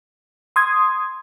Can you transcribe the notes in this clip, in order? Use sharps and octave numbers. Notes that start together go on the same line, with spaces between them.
C6 D#6 G#6